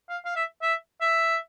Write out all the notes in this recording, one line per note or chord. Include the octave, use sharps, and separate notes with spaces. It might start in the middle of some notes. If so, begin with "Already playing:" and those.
F5
F5
E5
E5
E5